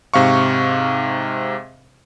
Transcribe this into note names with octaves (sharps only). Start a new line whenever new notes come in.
G#2 C3 F5 C#6